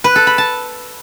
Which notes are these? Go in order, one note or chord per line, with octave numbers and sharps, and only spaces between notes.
B4
A4
B5
A5